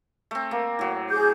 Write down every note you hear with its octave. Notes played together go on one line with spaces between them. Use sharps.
A3 C4
A#3
A2 F#3
G#4 D6 G6